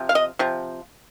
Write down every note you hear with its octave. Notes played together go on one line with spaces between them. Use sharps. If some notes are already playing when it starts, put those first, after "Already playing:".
Already playing: C3 F3
F5
D#5
C3 F3